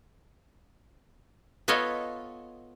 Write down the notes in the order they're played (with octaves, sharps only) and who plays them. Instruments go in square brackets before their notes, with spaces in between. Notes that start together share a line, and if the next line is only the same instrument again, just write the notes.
[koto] B3 F4 A4 C#5 D#5 F5